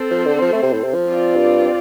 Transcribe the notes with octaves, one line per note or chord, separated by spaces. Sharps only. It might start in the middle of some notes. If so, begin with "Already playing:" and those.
Already playing: C4 A4 C5
F3
D3
F3
A3
C3
A2
C3
F3
C4 F4 D5
G2